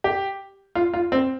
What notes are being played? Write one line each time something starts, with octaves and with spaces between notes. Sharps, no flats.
G4
F4
F4
C4